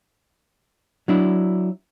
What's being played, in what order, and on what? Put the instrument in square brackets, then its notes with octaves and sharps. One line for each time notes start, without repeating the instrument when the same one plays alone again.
[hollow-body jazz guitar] F#3 D4 E4